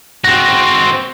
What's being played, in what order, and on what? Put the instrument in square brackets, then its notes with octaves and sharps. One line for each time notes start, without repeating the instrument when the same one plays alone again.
[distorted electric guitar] C4 F#4 [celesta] A#6